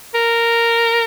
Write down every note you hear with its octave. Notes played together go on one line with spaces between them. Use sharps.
A#4